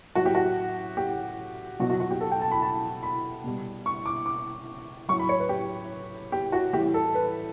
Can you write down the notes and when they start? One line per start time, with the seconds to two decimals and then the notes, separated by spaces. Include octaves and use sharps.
0.15 A2 F#3 F#4
0.26 G4
0.35 F#4
0.97 G4
1.79 B2 F#3 F#4
1.90 F#4
2.00 F#4
2.11 G4
2.21 A4
2.32 G5
2.41 A5
2.52 B5
2.62 A5
3.03 B5
3.44 B2 G3
3.86 C#6
4.06 D6
4.26 D6
5.09 A2 F#3 C#6
5.20 B5
5.29 C#5
5.39 B4
5.49 G4
6.32 G4
6.52 F#4
6.73 A2 E3 G3 G4
6.94 A4
7.14 B4